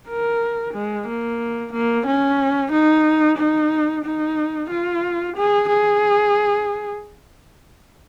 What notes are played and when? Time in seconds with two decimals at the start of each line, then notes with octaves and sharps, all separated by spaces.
0.08 A#4
0.74 G#3
1.07 A#3
1.72 A#3
2.06 C#4
2.72 D#4
3.38 D#4
4.05 D#4
4.70 F4
5.37 G#4
5.69 G#4